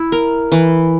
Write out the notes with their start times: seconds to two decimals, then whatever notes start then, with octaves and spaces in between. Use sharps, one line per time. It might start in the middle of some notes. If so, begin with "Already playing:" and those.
Already playing: E4
0.12 A#4
0.52 E3